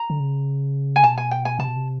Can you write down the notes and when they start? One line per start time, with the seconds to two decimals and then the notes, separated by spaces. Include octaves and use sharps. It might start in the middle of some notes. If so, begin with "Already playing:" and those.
Already playing: A#5
0.10 D3
0.20 C#3
0.96 G#5
1.04 B2 A5
1.18 G#5
1.31 G5
1.45 G#5
1.59 C3 A5
1.68 B2
1.76 C3